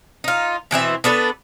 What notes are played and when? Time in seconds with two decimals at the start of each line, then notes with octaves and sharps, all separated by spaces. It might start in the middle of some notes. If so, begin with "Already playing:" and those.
0.24 D#4 F4
0.71 B2 E3 C4 E5
1.04 B3 D4 A4 B4